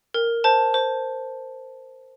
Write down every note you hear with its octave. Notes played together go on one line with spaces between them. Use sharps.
A#4
C5 A5
C5